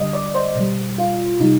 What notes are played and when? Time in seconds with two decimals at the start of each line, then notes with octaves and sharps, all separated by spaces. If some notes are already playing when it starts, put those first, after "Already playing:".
Already playing: D3 G3 D#5
0.13 D5
0.34 C5
0.56 B2 G3
0.98 F4
1.40 C3 G3 D#4